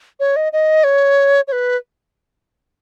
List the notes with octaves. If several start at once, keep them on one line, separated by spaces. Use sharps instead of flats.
C#5
D#5
D#5
C#5
C#5
B4